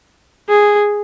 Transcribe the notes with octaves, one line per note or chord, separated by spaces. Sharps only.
G#4